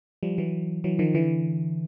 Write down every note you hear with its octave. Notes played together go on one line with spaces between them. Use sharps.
F3 G3
E3 F#3
E3 F#3
D#3 F3
D3 E3